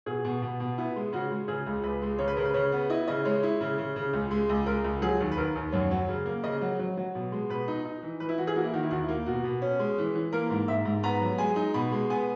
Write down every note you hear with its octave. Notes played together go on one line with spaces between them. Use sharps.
B2 G#4
B2
B2
B2
B3 E4
G#3
C#3 F#4
G#3
C#3 G#4
C#2
C#2 B4
G#3
C#3 C#5
B4
C#3 A#4
B4
C#3 C#5
B3
E4 D#5
C#3 D#5
G#3 C#5
E4
C#3
C#3
C#3
C#2
G#3
C#2
G#3 A#4
C#2
F#3 G#4
D#2
B4
D#2 A#4
D#2
F#2 C#5
F#3
C#3
A#3
C#3 D#5
F#3
F#3
F#3
B2
G#3
B2 B4
D#4
D#4
E3
E3 B4
E4
E3 F#4
G#4
A#3 F#4
E4
D#3 F#4
E4
D#2 F#4
E4
A#3
B2 F#4
B2
C#4
G#3
E3
E3
A#3 A#4
G#2
G#2 E5
G#2
B3 A#5
F#3
G#3 G#5
D#4
B2 B5
G#3
B3 G#5